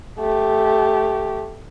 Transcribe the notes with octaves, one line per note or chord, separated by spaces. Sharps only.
A3 G4